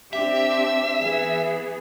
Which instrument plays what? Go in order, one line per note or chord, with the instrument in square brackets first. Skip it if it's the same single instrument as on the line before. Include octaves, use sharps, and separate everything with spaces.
[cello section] C4 D4 G4 [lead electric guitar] E5
[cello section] E3 B3 G#4